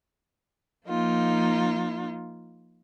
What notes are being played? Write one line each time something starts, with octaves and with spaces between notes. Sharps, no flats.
F3 A#3 D#4 F4